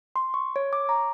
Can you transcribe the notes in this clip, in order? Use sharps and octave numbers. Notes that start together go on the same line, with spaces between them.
C6
C#6
C#5
D6
A#5